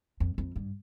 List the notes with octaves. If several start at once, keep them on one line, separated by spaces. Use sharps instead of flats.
F2
F2
G2